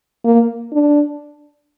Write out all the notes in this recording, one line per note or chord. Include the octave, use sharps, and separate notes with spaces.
A#3
D4